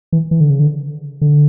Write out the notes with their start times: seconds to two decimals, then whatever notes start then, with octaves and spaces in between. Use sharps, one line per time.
0.12 E3
0.31 E3
0.41 D3
0.50 C#3
0.60 D3
1.21 D3